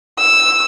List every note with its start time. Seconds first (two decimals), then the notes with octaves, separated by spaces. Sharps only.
0.19 E6